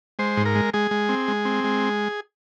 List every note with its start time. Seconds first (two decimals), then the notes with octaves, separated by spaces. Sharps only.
0.19 G#3 C5
0.37 G#2
0.46 A#4
0.55 G#3
0.74 G#3 G#4
0.91 G#3
1.09 C4
1.28 G#3
1.45 C4
1.64 G#3